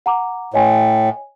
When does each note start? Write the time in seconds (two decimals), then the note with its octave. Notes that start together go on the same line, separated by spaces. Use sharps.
0.06 F#5 A#5 D6
0.54 A2 C#5 D#5 G#5